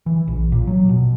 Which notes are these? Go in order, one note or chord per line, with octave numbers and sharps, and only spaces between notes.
E3
A#1
A#2
F#3
B2